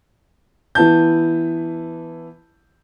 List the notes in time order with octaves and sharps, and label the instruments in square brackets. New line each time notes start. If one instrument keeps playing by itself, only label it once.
[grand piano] E3 B3 E4 A5 G6